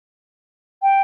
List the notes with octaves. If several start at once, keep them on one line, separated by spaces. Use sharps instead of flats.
G5